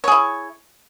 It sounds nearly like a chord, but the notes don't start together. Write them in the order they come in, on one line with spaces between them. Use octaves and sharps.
C#5 G#4 E4